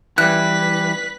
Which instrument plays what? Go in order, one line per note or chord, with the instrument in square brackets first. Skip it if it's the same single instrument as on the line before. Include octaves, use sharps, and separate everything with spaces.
[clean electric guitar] E3 G3 [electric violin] B4 B6 [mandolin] F#6